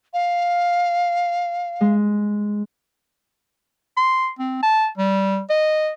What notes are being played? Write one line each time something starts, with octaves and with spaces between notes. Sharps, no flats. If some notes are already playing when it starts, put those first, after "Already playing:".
F5
G#3
C6
C4
A5
G3
D#5